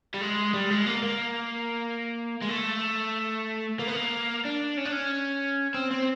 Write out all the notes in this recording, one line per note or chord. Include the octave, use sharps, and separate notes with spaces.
G3
G#3
G3
G#3
A#3
A#3
G#3
A3
A#3
B3
A#3
D4
C#4
D4
C#4
C4
C4